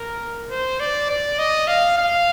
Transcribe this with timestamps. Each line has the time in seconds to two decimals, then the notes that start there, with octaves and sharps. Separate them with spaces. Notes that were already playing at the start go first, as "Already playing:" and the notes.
Already playing: A#4
0.50 C5
0.80 D5
1.10 D5
1.39 D#5
1.68 F5
1.98 F5